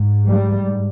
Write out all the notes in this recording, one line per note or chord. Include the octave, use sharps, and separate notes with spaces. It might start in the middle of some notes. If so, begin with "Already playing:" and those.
Already playing: G#2
G3